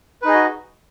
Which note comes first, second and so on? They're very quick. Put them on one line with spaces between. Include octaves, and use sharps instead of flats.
B4 D#4 G#4 D#5 F#4